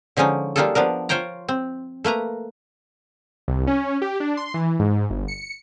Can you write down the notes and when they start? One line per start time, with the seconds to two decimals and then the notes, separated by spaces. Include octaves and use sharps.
0.17 D3 F3 G#3 C#4 D#4
0.56 G3 A#3 D#4 F4 G#4 A4
0.75 F3 B3 D4 A#4
1.09 F4 C5 C#5 G5 A#5
1.48 C4
2.04 A3 A#3 B4 A#5
3.48 C2
3.67 C#4
4.02 G4
4.20 D4
4.37 C6
4.54 E3
4.79 G#2
5.10 G1
5.28 C#7